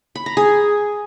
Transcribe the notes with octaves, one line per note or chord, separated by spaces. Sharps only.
B5
A#5
G#4